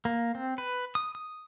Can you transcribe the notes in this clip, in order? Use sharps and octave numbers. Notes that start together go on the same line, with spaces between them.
A#3
C4
B4
D#6
D#6